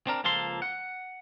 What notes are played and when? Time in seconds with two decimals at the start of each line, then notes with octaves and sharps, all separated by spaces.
0.07 C4 D4 A#4
0.24 C#2 F3 A#3 A4 C6
0.62 F#5